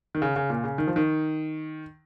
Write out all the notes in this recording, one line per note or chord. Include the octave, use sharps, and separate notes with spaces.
D#3
C#3
C#3
A#2
C#3
D#3
F3
D#3